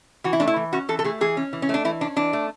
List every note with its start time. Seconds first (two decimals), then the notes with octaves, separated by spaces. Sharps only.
0.24 E3 F#4
0.33 E4
0.40 A3 D4
0.47 E4
0.56 E3
0.73 C#4 F#4
0.89 E3 A4
0.99 A4
1.04 A3 G#4
1.21 E3 G#4
1.37 C#4
1.53 E3
1.62 C#4
1.69 A3 D4
1.85 E3 E4
2.01 C#4 D4
2.16 E3 D4
2.33 A3